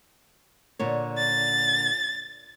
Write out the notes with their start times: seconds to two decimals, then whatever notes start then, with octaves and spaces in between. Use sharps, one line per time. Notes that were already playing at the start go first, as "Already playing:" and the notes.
0.79 A#2 D3 C#5
1.18 A6